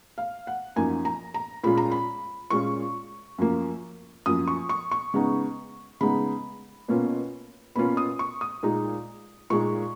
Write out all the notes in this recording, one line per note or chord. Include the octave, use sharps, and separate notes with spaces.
F5
F#5
F#2 F3 A#3 D#4 G#5
A#5
A#5
A#2 G#3 C#4 F4 B5
A#5
B5
A#2 G#3 C#4 F4 C#6
F#2 F3 A#3
F#2 F3 A#3 D#6
C#6
C#6
C#6
C#3 G#3 B3 D#4
C#3 G#3 B3 D#4 B5
B2 A#3 C#4 F4
B2 A#3 C#4 F4 B5
D#6
C#6
D#6
A#2 G#3 D#4
A#2 G#3 D#4 C#6